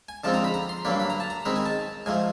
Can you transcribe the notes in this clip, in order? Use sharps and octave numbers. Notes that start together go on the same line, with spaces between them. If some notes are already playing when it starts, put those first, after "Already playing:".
G#5
D3 F3 G#3 C4 D#4 A5
A#5
B5
A#5
C6
G2 D3 F#3 A#3 D4 B5
B5
A#5
A5
A#5
D#3 G#3 C4 D#4 B5
G#5
A5
G#2 F3 A3 G#5